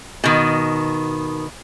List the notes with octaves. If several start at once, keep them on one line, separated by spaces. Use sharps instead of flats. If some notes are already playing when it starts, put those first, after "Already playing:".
B2 D#3